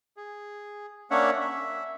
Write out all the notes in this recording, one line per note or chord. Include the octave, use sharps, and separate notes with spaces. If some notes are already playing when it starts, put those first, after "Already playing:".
G#4
A#3 C#4 D4 C#5 E5 F#5
E5